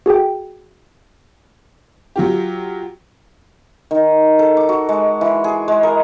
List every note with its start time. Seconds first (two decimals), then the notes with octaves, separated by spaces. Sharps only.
0.06 F#4 G#4 A4 G5
2.16 F#3 F4 G4
3.91 D#3
4.39 A4
4.57 D6
4.69 F#4
4.89 G#3
5.21 E3
5.44 G#4
5.68 G#3
5.83 A#4